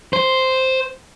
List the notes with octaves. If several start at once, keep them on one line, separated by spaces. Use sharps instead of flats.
C5